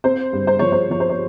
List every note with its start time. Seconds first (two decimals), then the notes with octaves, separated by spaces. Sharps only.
0.04 C4 C5
0.33 G2
0.47 C5
0.59 F3 C#5
0.72 C5
0.90 F3 C#5
1.00 C5
1.10 C#5